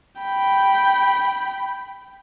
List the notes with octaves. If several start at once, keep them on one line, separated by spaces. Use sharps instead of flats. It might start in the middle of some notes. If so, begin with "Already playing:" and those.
G5 B5